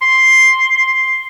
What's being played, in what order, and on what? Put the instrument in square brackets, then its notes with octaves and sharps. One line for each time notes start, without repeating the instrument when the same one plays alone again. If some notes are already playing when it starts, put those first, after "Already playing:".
[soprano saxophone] C6